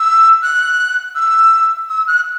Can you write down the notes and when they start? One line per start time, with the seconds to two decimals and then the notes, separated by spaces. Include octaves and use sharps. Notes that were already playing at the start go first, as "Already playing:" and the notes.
Already playing: E6
0.42 F#6
1.15 E6
1.89 E6
2.07 F#6